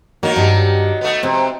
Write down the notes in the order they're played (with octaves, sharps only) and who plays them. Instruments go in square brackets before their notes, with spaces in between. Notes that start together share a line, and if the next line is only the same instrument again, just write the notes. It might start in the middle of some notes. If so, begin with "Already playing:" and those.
[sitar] D#3 F#3 [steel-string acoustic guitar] A#3
[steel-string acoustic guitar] G2 G4
[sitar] A3 B3
[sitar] C3 [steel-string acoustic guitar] C4 C5